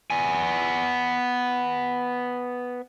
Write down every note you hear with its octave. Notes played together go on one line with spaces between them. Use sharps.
B3 G#5